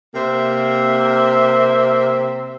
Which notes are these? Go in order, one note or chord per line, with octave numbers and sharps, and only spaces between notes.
C3 A#3 C5 E5